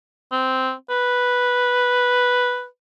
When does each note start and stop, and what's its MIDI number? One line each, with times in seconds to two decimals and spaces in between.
0.32 0.72 60
0.90 2.65 71